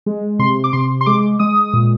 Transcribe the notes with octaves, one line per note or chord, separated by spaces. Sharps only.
G#3
C3 C6
D6
C3 C6
C6
G#3 D6
G#3 D#6
A#2